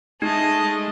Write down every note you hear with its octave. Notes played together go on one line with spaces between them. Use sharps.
G#3 A3 D#4 D#5